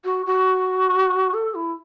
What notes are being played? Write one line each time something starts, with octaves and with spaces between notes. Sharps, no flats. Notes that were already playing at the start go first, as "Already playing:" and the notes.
F#4
F#4
A4
E4